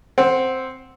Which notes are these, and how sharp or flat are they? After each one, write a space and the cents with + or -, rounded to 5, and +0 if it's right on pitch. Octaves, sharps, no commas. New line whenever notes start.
C4 +0 F#5 +0